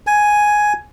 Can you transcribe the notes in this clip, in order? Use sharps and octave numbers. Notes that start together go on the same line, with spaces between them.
G#5